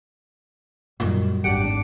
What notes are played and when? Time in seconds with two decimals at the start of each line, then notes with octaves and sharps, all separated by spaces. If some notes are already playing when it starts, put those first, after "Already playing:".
1.00 F#2 A#2 D#3 G3
1.44 G#1 E2 D4 G4 F#5 C#7 D7